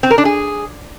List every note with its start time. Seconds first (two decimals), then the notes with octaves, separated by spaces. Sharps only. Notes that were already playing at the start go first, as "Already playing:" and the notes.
0.03 C4
0.11 A#4
0.18 D4
0.25 G#4